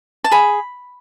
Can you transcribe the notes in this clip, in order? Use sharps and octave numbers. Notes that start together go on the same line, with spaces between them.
A5
G#4 B5